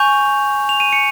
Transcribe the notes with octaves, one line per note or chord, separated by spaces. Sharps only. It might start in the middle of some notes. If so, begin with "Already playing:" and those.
Already playing: G#5 C#6 G6 F7
F7
D#7
C#7